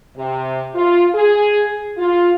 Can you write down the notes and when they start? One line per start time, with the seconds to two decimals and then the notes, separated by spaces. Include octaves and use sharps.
0.17 C3
0.75 F4
1.14 G#4
1.97 F4